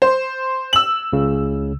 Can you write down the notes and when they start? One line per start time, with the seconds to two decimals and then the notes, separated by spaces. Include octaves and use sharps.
0.02 C5
0.73 E6 F#7
1.13 C#2 C#3